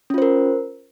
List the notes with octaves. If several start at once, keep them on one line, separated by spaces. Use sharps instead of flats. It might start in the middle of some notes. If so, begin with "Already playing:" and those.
C#4 F4 A#4 C5